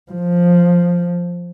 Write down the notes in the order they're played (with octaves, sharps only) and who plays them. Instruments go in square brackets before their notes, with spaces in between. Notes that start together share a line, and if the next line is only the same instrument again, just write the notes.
[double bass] F3